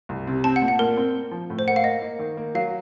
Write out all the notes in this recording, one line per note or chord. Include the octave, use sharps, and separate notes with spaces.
C2
C3
C4 A5
F#5
A#2
F#5
A#2 A#4
C4
A#3
F3
A2
C5
A#3 F#5
F5
A#3 D#5
A#3
D#3
A#3
F#3 F5